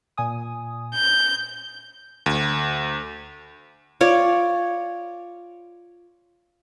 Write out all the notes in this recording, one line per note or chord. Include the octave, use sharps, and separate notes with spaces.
A#2 G#5 D#6
G6
D2
F4 C#5 D5